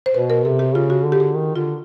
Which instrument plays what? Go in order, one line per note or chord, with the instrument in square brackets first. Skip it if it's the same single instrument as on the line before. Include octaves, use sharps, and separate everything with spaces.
[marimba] C5
[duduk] B2 [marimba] B4
[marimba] A#4
[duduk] C3 [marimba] A4
[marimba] G4
[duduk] C#3 [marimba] F4
[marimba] F#4
[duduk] D3
[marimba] G4
G#4
[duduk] D#3
[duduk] D3 [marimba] F4